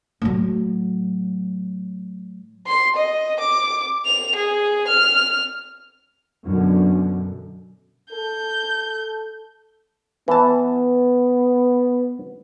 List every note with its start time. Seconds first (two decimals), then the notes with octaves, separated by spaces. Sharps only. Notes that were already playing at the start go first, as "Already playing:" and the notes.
0.22 A2 F#3
2.67 C6
2.96 D#5
3.39 D6
4.05 F7
4.35 G#4
4.87 F6
6.46 F#2 B2 D3
8.12 A4 G6
10.28 E3 B3 A5